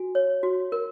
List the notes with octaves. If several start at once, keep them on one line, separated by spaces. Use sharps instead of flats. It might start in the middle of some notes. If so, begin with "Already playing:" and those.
Already playing: F#4 G#5
C#5
F#4
A#4